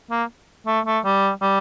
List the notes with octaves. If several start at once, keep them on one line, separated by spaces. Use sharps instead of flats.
A#3
A3
A3
G3
G3